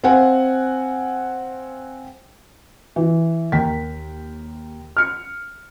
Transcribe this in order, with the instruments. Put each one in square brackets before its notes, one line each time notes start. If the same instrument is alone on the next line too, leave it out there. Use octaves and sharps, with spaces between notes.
[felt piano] C4 C5 F5 F#5 G#5
E3
D#2 A#4 G5 B6
F6 C#7